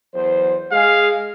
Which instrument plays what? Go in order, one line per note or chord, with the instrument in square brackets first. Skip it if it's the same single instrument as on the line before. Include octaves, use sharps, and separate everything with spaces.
[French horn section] E2 F#3 C5
[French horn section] G#3 G#4 [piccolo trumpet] F5